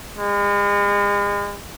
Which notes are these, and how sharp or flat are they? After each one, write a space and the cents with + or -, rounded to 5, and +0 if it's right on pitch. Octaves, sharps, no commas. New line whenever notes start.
G#3 -40